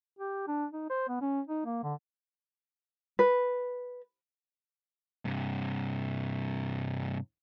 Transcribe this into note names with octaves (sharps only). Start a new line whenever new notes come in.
G4
D4
D#4
C5
B3
C#4
D#4
A#3
D3
B4
G2 C3